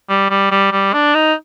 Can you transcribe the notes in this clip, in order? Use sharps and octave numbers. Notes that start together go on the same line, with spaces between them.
G3
G3
G3
G3
D4
D#4